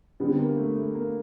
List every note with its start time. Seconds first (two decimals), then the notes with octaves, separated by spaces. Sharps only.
0.20 D3 G3 B3 C4
0.39 A#3
0.57 A3
0.76 A3
0.95 A#3